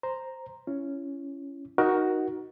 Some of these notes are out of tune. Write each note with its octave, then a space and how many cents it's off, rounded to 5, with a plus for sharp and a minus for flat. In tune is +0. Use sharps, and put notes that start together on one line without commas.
C5 +0 A#5 +0
C#4 +5 E4 +30
D#4 +5 F#4 +0 A#4 +20